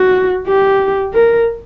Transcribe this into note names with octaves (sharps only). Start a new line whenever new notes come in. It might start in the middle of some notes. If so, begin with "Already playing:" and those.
Already playing: F#4
G4
A#4